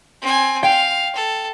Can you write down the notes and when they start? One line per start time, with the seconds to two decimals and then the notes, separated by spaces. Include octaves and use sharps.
0.22 C4 G#5
0.63 F5 G5
1.15 A4